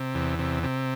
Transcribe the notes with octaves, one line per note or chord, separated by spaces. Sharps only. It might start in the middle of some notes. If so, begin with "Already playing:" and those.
Already playing: C3
E2
C3
C3